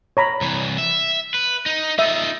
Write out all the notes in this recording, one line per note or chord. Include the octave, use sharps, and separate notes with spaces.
C#5 A#5 B5
C2 E3
E5
B4
D#4
D#4 F4 E5